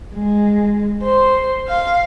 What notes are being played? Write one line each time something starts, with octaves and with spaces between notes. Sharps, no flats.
G#3
C5
F5